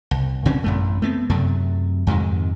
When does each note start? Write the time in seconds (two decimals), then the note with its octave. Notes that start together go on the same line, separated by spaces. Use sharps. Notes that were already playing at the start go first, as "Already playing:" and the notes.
0.11 C2
0.45 A#2 C4 C#4
0.64 A1 F#2 A3
1.02 A3 B3 C4
1.30 F#2 C3 F#3 A3
2.07 F2 G#2 C3 D#3